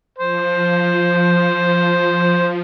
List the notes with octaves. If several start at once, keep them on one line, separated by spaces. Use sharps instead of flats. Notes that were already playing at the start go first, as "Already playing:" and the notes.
F3 C5